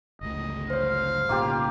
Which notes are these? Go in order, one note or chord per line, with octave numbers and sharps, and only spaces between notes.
G1 C#2 A3 D#5
C5 C#5 F5
B1 A2 C#3 A#3 F4 G4